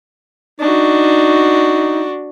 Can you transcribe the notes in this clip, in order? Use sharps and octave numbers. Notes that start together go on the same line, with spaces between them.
D4 D#4 F#4